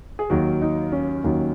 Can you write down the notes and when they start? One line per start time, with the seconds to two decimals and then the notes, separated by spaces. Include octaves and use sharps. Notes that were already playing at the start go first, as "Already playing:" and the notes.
0.19 G#4
0.30 D#2 D#3 F#3 F#4
0.62 D#4
0.92 C#4
1.24 D#2 D#3 F#3